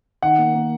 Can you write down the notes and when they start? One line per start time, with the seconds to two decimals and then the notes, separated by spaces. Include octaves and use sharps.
0.22 D#3 F#5
0.38 A#3
0.54 A#3